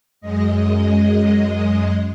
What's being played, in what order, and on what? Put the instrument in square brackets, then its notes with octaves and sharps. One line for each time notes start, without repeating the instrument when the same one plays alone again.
[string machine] F#2 G#3 D#5